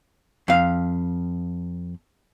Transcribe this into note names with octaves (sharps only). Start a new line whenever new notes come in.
F2 F5